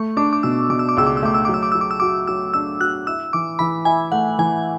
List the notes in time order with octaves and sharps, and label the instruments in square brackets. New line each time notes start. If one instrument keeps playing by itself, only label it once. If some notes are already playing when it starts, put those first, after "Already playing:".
Already playing: [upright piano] A3 [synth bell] C#6
[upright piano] D4 [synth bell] D6
[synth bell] D6
[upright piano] B2 [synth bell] E6
[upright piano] B2 [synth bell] D6
[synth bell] E6
D6
[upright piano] C#2 [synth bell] E6
[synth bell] D6
E6
[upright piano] A3 [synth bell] D6
[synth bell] E6
[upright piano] F#3 [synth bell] D6
[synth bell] E6
D6
[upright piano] F#3 [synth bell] E6
[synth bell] D6
E6
[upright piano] F#4 [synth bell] D6
[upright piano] F#3 [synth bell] E6
[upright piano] D4 [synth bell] E6
[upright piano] F#4 [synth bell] F#6
[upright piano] E4 [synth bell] E6
[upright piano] E3 [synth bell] D6
[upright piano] E3 [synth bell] B5
[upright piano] E4 [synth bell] G#5
[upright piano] A3 [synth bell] F#5
[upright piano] E3 [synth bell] G#5